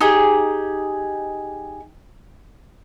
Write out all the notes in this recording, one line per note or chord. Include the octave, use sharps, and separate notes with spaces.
D#4 G4 G#4